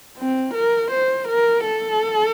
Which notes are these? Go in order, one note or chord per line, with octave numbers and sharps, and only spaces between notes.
C4
A#4
C5
A#4
A4